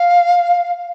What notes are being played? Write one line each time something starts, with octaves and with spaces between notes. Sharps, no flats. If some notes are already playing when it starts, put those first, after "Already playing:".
Already playing: F5